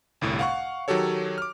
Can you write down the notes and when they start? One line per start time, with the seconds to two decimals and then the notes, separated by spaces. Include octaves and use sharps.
0.21 G1 C2 A2
0.39 F5 F#5 C#6
0.88 D#3 F#3 F#4 G4 A4 C#5
1.38 D6 F6